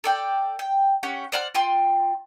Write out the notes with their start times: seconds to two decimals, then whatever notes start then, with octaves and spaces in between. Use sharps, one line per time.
0.04 A4 D5 G5
0.59 G5
1.03 C#4 G4 F#5
1.32 C5 D5 F#5 F6
1.55 F4 G5 C6